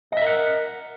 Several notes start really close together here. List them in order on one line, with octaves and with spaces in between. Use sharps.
D#5 E5 A#4 F#5